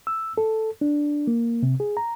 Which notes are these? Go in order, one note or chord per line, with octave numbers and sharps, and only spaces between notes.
E6
A4
D4
A#3
C3
G#4
A#5